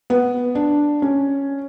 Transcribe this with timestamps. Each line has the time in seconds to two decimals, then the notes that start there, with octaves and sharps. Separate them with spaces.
0.10 B3
0.55 D4
1.02 C#4